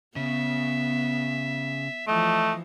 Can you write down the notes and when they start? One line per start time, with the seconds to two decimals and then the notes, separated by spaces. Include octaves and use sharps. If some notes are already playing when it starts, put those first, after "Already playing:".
0.16 C#3 B3 E5
2.08 E3 F3 A3 D#5